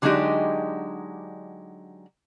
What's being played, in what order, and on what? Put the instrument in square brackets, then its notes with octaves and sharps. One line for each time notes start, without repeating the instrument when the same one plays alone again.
[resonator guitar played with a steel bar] D3 F#3 G#3 D4 D#4 G4